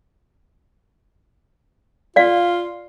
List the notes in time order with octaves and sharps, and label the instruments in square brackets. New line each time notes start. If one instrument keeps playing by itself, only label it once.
[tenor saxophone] F4 [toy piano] D5 F5